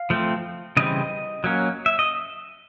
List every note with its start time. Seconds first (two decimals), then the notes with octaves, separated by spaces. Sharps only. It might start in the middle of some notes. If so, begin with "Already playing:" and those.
Already playing: F5
0.10 F3 A3 C4
0.77 C#3 E3 G3 C4 D#5
1.44 F#3 A#3 C#4
1.86 E5
1.99 D#5